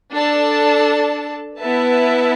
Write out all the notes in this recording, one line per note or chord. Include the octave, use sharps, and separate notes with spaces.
D4 A4 D5 A5
B3 E4 B4 E5 A5